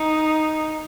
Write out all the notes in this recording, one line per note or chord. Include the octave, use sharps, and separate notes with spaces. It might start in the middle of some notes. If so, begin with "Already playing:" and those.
Already playing: D#4